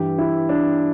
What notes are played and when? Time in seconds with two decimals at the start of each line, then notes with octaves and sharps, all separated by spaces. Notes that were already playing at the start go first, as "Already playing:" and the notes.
Already playing: G2 E3 G4
0.18 E4
0.49 D4